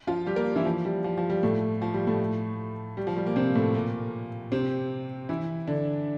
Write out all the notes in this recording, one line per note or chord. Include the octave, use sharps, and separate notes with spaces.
F3 F4
G3 G4
A#3 A#4
E3 E4
F3
G3
F3
F3
G3
A2 A3
F3
G3
A2 A3
G3
F3
G3
A#2 A#3
C3 C4
A2 A3
A#2 A#3
C3 C4
E3 E4
D3 D4